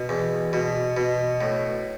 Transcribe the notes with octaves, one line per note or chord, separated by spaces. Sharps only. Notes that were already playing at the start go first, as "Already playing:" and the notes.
Already playing: B2
E2
B2
B2
A2